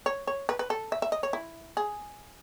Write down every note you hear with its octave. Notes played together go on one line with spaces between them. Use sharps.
C#5
C#5
B4
B4
A4
E5
E5
D#5
C#5
E4
G#4